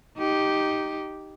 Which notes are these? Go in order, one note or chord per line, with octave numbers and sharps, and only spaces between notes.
D#4 G4